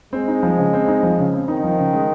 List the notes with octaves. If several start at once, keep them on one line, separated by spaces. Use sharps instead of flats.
G#3 C4
D#4
F3
C#3
C4
D#4
F3
C#3
C4
D#3 D#4
F3
C#3
G#3